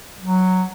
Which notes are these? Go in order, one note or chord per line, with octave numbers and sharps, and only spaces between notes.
F#3